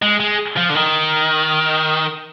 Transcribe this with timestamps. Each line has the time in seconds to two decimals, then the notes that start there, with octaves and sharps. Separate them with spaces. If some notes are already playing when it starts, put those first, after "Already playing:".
0.02 G#3
0.20 G#3
0.56 F3
0.69 D3
0.75 D#3